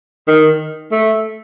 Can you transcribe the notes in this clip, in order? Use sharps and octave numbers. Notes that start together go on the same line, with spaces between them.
D#3
A3